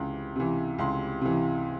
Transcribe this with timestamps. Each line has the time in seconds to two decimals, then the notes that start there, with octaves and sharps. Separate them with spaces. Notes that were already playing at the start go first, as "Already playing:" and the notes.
Already playing: C#2 C3 E3
0.36 C3 E3
0.78 C#2 C6
1.21 C3 E3